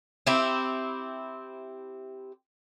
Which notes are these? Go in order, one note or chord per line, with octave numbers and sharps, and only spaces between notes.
C4 E4 G4